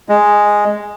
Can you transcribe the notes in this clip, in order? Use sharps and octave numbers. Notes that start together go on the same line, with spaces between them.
G#3